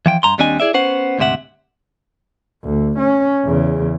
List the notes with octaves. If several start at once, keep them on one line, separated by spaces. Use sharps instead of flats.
E3 F3 G5
G2 A#5 C6
D#2 G3 C4 D4 D#5 G#5
E4 G#4 D5 E5
B3 C#4 C5 F#5
D2 G#2 C3 E5 F#5
D2
C#4
E2 C#3